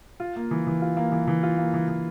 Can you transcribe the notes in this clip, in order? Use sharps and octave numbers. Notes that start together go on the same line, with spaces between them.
F4
A#3
E3
E3
F4
A#3
E3
E3
F4
A#3
E3
E3